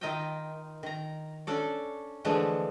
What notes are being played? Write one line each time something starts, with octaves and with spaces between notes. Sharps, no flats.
D#3 D#4 F4 D#5 E5 G5
D#3 A#5
C#4 D4 A4 D5
D3 E3 F3 G#3 A3 D4